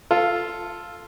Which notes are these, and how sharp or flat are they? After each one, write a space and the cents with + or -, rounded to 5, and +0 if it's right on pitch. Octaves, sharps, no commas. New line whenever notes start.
F4 +0 A4 +5